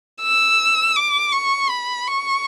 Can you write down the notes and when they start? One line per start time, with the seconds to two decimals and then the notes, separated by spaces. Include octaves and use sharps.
0.22 E6
0.96 D6
1.32 C#6
1.70 B5
2.07 C#6